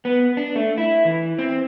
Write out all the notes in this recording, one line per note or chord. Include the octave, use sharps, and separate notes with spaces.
B3
D4
A3
E4
E3
C4